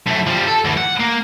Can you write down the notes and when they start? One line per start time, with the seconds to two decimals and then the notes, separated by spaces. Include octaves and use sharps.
0.07 F#2 A3
0.27 F3 G3
0.47 A4
0.65 D2 E3
0.77 F#5
1.00 A#3